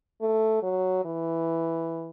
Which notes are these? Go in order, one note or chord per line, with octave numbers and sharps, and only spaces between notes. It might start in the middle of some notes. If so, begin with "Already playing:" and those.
A3
F#3
E3